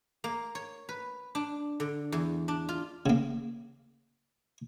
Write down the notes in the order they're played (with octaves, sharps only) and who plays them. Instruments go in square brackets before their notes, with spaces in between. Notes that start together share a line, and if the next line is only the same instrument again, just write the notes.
[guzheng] A#3
C#5
B4
D4
D3
E2
D4
F4
[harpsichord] C#3 A#3